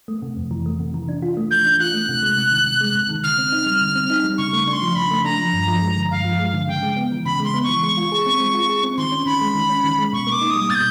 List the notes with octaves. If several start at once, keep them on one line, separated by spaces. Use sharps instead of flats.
A3
C3
F2
E3
A3
C3
E3
D4
F4
A3
E3 G6
D4
F4 F#6
A3
C3
G#3
C3
D#3
C3
G#3
C3
D#3
D3 F6
C4
D#4
G3
D3
C4
D#4
G3
C#3 C#6
A3
D4 C#6
C6
F3
C#3 B5
A3
D4 A#5
F3
G2
F3
G#3
D3
G2 F5
F3
G#3
D3
C#3 G5
G#3
B3
E3
C#3 B5
G#3 C6
B3
C#6
E3
G#3
F4
G#4
C4
G#3
F4
G#4
C4
D#3 C6
C#4
D#3 B5
G#3
D#3
C#4
D#3
G#3
B2 C#6
A#3
D6
D#4
G3 D#6
B2 A6
G6